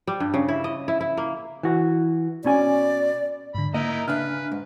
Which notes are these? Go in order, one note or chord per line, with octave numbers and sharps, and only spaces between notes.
G3
G2
C#3
E4
D#5
E4
E4
A#3
E3 F#4
B2 C#4 D5 G#5
G#2 D3 B5
A#3 D#4 E4 A#4 D#5
C#3 D4 B4 E5 G#5 F6
G#2